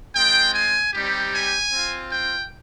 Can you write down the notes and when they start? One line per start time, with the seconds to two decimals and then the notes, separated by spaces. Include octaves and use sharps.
0.15 G#3 C4 F4 G5
0.54 G#5
0.93 G3 C4 D#4 G4
1.33 G#5
1.72 C4 F4
2.11 G5